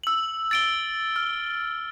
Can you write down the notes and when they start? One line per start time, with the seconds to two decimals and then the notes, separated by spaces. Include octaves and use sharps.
0.04 E6 F#7
0.51 A6 D7 G7
1.16 F6